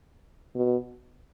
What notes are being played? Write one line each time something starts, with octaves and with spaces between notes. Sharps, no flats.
B2